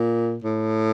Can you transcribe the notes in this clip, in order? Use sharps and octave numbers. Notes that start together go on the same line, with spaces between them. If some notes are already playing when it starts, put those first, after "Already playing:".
Already playing: A#2
A2